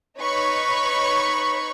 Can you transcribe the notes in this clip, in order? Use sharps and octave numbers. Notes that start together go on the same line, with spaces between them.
D#4 B4 C#5 B5 C#6